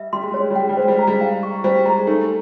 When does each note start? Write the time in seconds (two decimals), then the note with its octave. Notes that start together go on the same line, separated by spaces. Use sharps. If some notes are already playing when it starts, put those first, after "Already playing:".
Already playing: G3 E5
0.13 G3 C6
0.22 G#3
0.32 G3 C#5
0.41 G#3
0.51 G3
0.55 G#3 G5
0.69 G3
0.77 G#3 C5
0.88 G3
0.98 G#3 A#5
1.07 G3
1.21 F5
1.43 C#6
1.64 G3 C5
1.86 G#3 A#5
2.07 A3 D#4